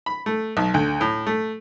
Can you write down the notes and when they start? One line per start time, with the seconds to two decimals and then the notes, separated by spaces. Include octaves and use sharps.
0.06 B5
0.26 A3
0.57 B1
0.74 D2
1.01 A2
1.27 A3